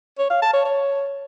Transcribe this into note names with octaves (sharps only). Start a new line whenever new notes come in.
C#5
F5
A5
C#5
C#5